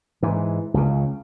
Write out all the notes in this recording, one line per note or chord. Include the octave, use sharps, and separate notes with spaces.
G#2 E3
C#2 C#3